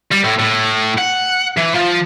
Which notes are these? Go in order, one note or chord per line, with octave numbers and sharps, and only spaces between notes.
G3
A2
A2
F#5
E3
F3